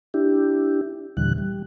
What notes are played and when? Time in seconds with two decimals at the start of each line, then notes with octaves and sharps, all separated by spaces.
0.14 D4 E4 G4
1.17 D#2 A#2 D3 E3 G3 F#6
1.38 G3